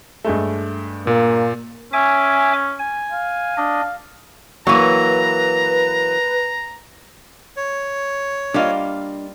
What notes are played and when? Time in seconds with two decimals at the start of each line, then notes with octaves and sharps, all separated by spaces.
0.24 G2 G#3 A3
1.07 A#2 A#3
1.93 C#4 E5 G#5 D6
2.79 G#5
3.12 F5
3.57 D4 D#5
4.67 E3 F#3 A#3 B4 A#5
7.57 C#5
8.54 G3 A#3 D4 F4 D#5